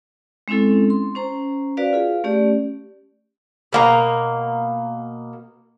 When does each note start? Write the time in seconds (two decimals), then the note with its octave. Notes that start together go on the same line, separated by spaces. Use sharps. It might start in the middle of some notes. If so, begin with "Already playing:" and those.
0.48 G#3 C4 C#4 E4 A4
0.90 C6
1.15 C#4 C5 A#5
1.77 F#4 B4 D5 F5
1.93 F4 G#4 F5
2.24 A3 C#4 G4 D5
3.73 B2 A#3 A#5